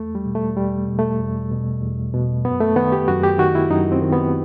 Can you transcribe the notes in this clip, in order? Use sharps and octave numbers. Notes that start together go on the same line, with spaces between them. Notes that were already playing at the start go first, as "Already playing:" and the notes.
Already playing: E2 A3
G3
B2
A3
E2 G3
B2
A3
E2
B2
E2
B2
F#2 B3
A3
D#3 B3
G4
F#2 F#4
G4
D#3 F#4
E4
F#2 D#4
C4
D#3
B3